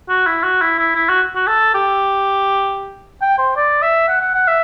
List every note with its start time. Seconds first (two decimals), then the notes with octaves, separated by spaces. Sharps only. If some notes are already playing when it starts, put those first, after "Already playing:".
0.09 F#4
0.26 E4
0.43 F#4
0.61 E4
0.79 E4
0.95 E4
1.09 F#4
1.35 F#4
1.47 A4
1.74 G4
3.22 G5
3.38 C5
3.57 D5
3.82 E5
4.08 F#5
4.21 F#5
4.34 F#5
4.48 E5